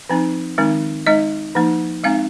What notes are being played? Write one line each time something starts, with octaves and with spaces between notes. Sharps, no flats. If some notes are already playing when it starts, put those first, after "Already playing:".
F3 C4 D#4
D#3 G#3 C4 D#4
G#3 D#4 D#5
F3 A#3 D#4
G#3 C4 D#4 F5